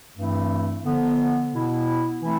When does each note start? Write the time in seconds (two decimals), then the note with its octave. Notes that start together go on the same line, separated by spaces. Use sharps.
0.16 G2 E3 A3 C4 E4
0.84 D3 F3 B3
1.53 B2 B3 E4
2.22 E3 A3 C4 E4